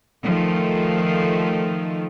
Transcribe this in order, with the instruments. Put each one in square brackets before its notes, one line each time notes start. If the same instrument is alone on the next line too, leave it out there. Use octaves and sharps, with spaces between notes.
[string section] D#3 F3 A3